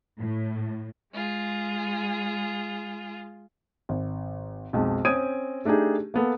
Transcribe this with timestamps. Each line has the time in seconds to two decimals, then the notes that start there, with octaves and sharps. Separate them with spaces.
0.20 A2
1.13 G#3 F4 G#4
3.89 G#1
4.73 B1 F2 G#3
5.05 C4 C#4 D#6 G#6 D7 D#7
5.65 A3 D4 D#4 G4 G#4
6.14 A#3 B3 A4